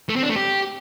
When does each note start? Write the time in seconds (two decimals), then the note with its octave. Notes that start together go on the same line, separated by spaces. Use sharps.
0.09 A3
0.16 C4
0.23 D4
0.29 A3
0.36 G4